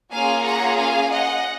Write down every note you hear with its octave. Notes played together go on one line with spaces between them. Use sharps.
A#3 C#4 F4 G#4 F5 G#5
F#5 A#5
F5 G#5
D#5 F#5